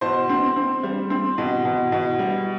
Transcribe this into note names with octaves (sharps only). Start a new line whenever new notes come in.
B2 C5
C4
C4
G3
C4
B2
B2
B2
G3